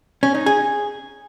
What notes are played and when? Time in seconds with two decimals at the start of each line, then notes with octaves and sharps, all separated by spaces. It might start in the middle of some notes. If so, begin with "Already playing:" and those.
0.23 C#4
0.35 D#4
0.46 G#4